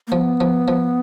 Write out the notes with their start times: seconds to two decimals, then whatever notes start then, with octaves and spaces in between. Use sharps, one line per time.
0.07 A#3
0.12 F3 B3
0.41 F3
0.68 F3